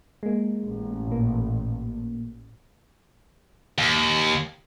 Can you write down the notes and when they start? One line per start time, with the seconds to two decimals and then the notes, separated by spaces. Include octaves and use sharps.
0.23 G#3 A#3
0.63 A1
1.08 A#2 A#3
3.78 D#2